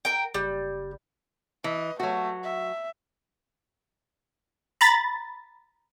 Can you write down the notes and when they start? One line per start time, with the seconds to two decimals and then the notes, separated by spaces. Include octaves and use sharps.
0.05 A#4 G5
0.34 F#1 G3
1.64 E3 D#5
2.00 F#3 A3 F#4
2.44 E5
4.81 A#5 B5 A6